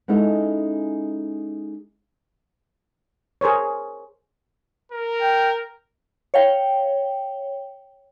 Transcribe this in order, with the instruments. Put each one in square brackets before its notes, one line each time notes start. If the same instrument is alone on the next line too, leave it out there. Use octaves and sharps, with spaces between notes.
[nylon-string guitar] G#3 B3 C#4 D#4 E4 A4
[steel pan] G#4 A#4 C5 C#5
[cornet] A#4
[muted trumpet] G5
[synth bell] C#5 F5 G5